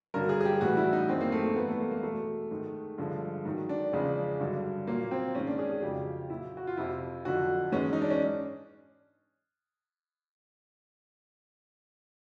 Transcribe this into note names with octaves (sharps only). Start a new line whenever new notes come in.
G2 D3 F#3 A#4
G#4
G#4
G4
A2 E3 G3 F#4
E4
D#4
F#2 D#3 G#3 C4
A#3
A3
A#3
G#2 E3 G3 B3
A3
A#3
A#3
E2 B2 G#3 A3
G#2 D#3 G#3
G2 D3 F3 G#3
G#2 D#3 F#3
D4
E2 C#3 F3 G#3
G2 D3 F#3
A#2 F#3 A#3
C4
G#2 D#3 G#3 C#4
D4
G#4
G#4
F2 C#3 F#3 G4
A#2 F#3 E4
F#4
F4
F2 C3 F3 E4
F2 D3 F#3 F#4
G#2 E3 G#3 C#4
D#4
D4
C#4